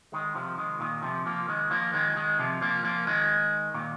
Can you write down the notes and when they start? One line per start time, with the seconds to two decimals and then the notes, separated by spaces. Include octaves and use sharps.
0.12 D#3 G#3
0.35 C3 F3
0.58 D#3 G#3
0.80 A#2 D#3
1.03 C3 F3
1.26 F3 A#3
1.48 D#3 G#3
1.71 F3 A#3
1.93 D#3 G#3
2.16 D#3 G#3
2.39 C3 F3
2.61 F3 A#3
2.84 F3 A#3
3.07 D#3 G#3
3.74 A#2 D#3